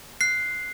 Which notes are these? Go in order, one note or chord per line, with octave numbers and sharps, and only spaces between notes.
F#6 C7